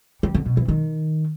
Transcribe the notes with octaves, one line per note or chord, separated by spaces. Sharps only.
G3
D3
B2
E3
D#3